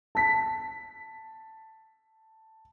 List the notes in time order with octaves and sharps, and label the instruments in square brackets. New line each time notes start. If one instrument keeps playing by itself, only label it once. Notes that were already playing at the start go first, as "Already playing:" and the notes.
[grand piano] A5 B6